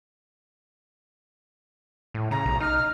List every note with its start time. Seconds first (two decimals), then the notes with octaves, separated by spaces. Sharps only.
2.14 A2
2.31 C#3 A#5
2.46 B1
2.60 D#4 F6